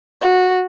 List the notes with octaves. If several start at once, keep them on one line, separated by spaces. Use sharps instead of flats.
F#4